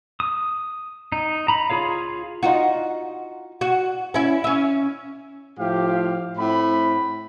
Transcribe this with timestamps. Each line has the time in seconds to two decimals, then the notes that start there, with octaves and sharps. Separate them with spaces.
0.20 D#6
1.12 D#4
1.48 A#5 B5
1.70 F4 G#4 C#5 F5
2.43 D#4 F4 F#4
3.61 F#4
4.14 C#4 E4
4.44 C#4 E5
5.58 A2 F3 G4 F5
6.38 A2 C4 B5